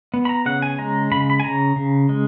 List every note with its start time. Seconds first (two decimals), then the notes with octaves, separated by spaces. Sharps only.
0.14 B3
0.25 B5
0.29 A#5
0.46 C#3 F#5
0.62 G#5
0.78 G#3 A#5
1.12 C#3 B5
1.30 B5
1.40 G#5
1.44 C#3 A#5
1.76 C#3
2.09 G#3